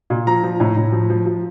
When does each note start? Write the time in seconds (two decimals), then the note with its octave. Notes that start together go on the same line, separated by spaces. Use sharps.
0.10 A#2
0.27 F3 A#5
0.43 F3
0.60 A2
0.77 A2
0.92 F3
1.10 F3
1.26 F3